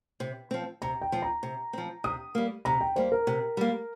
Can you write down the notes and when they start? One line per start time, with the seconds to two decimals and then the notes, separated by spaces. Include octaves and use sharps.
0.20 C3
0.51 F3 C4
0.82 C3 A#5
1.02 G5
1.12 F3 C4
1.22 A#5
1.43 C3
1.73 F3 C4
2.04 C3 D#6
2.35 G3 A#3
2.65 C3 A#5
2.81 G5
2.96 G3 A#3 C5
3.12 A#4
3.27 C3
3.57 G3 A#3